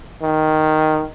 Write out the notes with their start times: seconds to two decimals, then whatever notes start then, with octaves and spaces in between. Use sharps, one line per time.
0.22 D#3